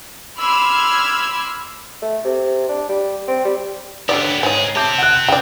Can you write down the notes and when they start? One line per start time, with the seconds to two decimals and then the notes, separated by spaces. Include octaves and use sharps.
0.38 B5 C6 D6 E6 F6 G#6
2.02 A3
2.24 C3
2.68 D4
2.89 G3
3.28 C4
3.45 G3
4.09 D3 F#3 B3 G4 D5
4.43 G#2 G#4 C#5 G#5
4.76 C4 G4 A5 D6 G6
4.98 F#5 F#6
5.28 C#3 D5 G5